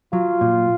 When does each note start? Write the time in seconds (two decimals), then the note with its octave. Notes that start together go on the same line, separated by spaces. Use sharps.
0.13 F#3 F4
0.41 A#2